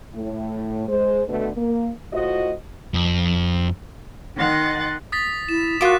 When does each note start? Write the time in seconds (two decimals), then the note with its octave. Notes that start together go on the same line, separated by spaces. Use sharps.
0.14 A2
0.88 G#3 C5
1.28 B2 D3 A3 B3
1.57 A#3
2.13 A2 F4 F#4 C5 D#5
2.94 F2
4.37 D#3 D#5 F#5 C6 F#6 A6
5.12 D#6 A6 B6
5.49 E4 E7
5.81 F4 F#4 A#4 D6 F#6 E7